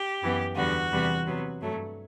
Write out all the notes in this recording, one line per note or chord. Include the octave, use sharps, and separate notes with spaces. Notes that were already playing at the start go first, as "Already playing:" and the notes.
Already playing: G4
F#2 E3 B3
E2 D3 G3 B3 F#4
E2 C3 E3 G3 B3
C3 F#3 B3
G2 F#3 A3